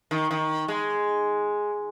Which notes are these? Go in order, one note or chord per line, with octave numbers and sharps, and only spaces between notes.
D#3
D#3
G#3